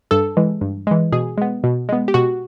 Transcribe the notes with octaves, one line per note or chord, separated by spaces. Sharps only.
G2 A4
E3 G#3
G2
E3 G#3
B2 G#4
G#3 B3
B2
G#3 B3
G4
B2 F#4